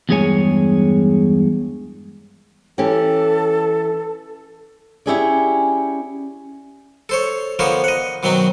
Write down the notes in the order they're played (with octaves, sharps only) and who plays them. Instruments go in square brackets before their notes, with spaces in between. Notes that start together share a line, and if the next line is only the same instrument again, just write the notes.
[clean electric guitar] E2 G2 G#3 G#4 C#5 G#5
[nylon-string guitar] E3 C#4 G4 [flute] A4
[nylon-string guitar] C#4 E4 G4 G#4 C#5 D5
[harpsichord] A4 C5 C#5
D3 F3 B3 A#4 C5 C#5
D#5 F#5
B2 D#3 F#3 C4 F#4